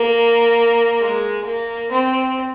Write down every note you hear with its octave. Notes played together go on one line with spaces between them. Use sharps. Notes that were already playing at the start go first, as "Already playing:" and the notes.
Already playing: A#3
G#3
A#3
C4